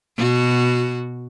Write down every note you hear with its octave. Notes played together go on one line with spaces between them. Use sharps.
B2 F#4